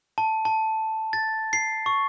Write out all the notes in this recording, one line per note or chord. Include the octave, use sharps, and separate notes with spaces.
A5
A5
A6
C7
C#6